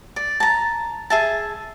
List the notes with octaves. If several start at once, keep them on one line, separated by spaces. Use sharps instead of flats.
D5
A5 A#5
G#4 E5 A5